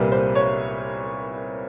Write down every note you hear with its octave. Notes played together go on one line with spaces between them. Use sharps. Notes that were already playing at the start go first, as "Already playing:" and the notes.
Already playing: C2 A#2 G3 B4
C5
C#5